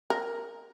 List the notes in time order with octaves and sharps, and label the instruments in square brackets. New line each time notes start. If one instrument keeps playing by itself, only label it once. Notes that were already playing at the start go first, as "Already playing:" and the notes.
[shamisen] A#4